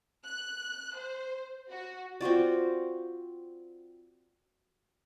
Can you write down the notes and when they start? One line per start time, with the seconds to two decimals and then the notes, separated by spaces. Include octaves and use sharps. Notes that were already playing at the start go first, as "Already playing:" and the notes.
0.24 F#6
0.96 C5
1.69 F#4
2.21 C4 F4 F#4 D5